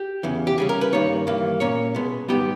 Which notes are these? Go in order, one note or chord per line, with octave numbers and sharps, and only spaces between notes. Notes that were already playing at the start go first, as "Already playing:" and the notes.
Already playing: G4
E2 C#3 E3
G4
C#3 G3 C#4 G#4
A#4
B4
G2 D#3 A#3 C#5
G2 E3 A#3
A#2 A#3 C#4 C#5
B2 G#3 B3
G#2 D#3 G3 B3 G4